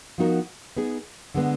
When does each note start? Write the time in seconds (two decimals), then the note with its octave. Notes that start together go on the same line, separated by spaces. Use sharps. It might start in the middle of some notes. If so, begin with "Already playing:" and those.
0.18 F3 B3 D#4 F#4 A#4
0.77 B3 D#4 G#4
1.34 D3 G#3 B3